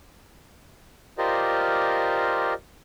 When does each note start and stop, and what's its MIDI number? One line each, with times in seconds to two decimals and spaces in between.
1.18 2.53 65
1.18 2.53 67
1.18 2.53 70
1.18 2.53 72
1.18 2.53 74
1.18 2.53 75